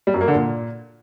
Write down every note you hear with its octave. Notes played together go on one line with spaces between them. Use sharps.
G3
F#2
A#3
D3
A#2